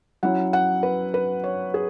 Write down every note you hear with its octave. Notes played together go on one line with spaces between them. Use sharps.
F#3 C#4 E4 F#5
F#5
B4
B4
C#5
G#4